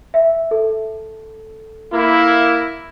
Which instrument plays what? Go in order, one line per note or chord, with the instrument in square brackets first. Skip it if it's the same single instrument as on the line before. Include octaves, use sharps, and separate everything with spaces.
[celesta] E5
A4
[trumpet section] A#3 E4